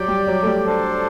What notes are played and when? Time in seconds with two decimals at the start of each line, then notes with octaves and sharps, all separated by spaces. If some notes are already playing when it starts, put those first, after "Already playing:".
Already playing: F#3 G4 D5 G5
0.08 G3
0.28 F#3
0.43 A3
0.47 G3
0.66 D4 A4 C5